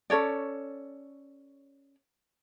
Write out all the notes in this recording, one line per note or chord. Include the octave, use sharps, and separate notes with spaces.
C#4 A4 C#5 D5